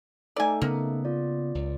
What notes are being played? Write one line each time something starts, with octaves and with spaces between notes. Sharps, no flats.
A3 D#4 A4 D5 G#5
C#3 A#3 B3
F4 D5
C#2